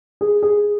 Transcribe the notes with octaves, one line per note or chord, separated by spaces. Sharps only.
G#4
G#4